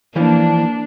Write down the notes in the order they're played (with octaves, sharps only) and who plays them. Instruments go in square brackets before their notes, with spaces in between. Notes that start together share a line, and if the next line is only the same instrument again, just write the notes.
[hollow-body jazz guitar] E3 F3 [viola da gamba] A#3 [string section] D4